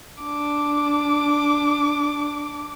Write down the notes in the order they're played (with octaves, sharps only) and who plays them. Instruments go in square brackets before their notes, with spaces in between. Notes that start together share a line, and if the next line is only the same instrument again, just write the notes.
[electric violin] D4 D6